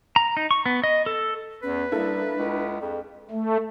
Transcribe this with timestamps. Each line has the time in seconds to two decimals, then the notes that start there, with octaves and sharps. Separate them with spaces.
0.16 A#5
0.37 D#4
0.51 C#6
0.66 B3
0.84 D#5
1.06 A4
1.63 E2 C#4 B4
1.92 C2 A#3 D4 E4 A4
2.37 C#2
2.81 F2 G#4
3.31 A3